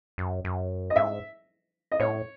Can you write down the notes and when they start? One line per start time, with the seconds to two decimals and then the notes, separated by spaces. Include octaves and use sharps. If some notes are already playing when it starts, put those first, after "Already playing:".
0.18 F#2
0.45 F#2
0.90 D#5
0.96 G#2 E5
1.92 D#5
2.00 A2 C#5